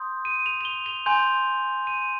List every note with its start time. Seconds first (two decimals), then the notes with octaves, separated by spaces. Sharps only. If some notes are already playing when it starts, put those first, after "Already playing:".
Already playing: C6 D#6 G6
0.25 D#7
0.46 F7
0.61 F7
0.65 G7
0.86 F7
1.06 G#5 C6 G6
1.87 D#7